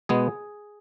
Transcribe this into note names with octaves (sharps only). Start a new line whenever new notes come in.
B2 G#3 B3 G#4